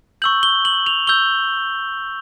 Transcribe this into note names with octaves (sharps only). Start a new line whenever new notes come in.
C#6 E6 G6 F#7
G7
F#7
F7
C#6 E6 G6 G7